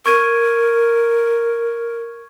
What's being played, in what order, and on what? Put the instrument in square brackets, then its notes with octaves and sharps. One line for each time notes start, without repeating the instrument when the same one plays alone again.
[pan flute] A#4 [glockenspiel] C#6 G#6 D#7